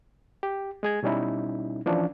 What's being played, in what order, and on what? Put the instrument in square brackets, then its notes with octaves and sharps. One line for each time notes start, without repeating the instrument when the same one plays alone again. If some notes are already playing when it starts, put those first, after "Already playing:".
[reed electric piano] G4
G#3 G#4 G#6
B2 G3 C#4 D#4 E4
E3 F3 C#4 D4